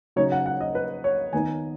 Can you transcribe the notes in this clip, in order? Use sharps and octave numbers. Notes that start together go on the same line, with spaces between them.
C#3 F#3 D#4 C#5
F#5
F#5
D#5
B4
C#5
D#3 B3 D#4 G#5